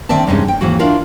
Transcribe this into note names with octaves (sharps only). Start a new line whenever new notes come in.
D3 D#3 C4 D5 E5 A5
E2 G2 C3 G#3 C#4 D#4
G5
D#2 G#2 E3 F#4
D4 E4 F4 A#4 D5